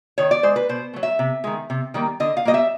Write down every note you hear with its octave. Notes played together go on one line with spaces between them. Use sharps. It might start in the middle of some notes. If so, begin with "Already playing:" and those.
D#3 C#5
D5
G#3 C5
B4
B2 C5
F#3 A3
E5
C3
D#3 G#3
C3
D#3 G3 A#3
D3 D#5
F5
G3 A#3 D#5
E5